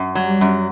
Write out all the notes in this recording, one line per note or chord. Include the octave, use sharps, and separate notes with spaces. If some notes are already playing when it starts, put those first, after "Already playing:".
Already playing: F#2
F#3 G3
F#2